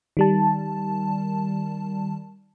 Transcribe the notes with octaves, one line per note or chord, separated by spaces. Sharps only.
D#3 G3 A5